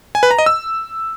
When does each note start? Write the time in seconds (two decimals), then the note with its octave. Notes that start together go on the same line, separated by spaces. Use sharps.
0.15 G#5
0.23 B4
0.31 A#5
0.39 D#5
0.46 E6